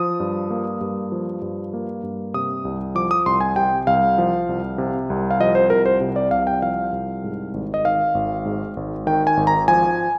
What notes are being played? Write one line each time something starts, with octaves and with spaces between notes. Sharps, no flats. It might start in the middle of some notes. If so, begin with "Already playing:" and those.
Already playing: F3 D#6
G2
A#3
G2
F3
G2
A#3
G2
C3 D#6
C2
F3 D6
D#6
C2 C6
G#5
C3 G5
C2 F5
F3
C2
C3
C2
F5
F3 D#5
C5
C2 A#4
C5
C3
D5
C2 F5
G5
F3 F5
C2
G#2
G#1
D#5
D#3 F5
G#1
G#2
G#1
D#3 G5
G#5
G#1
A#5
F3 G#5